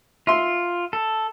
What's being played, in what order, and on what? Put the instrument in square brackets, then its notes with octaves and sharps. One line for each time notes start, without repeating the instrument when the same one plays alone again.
[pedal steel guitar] F4 [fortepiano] E5 C6
[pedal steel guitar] A4